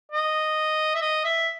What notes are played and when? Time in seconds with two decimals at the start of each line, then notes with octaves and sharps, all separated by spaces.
0.12 D#5
0.95 E5
1.01 D#5
1.24 E5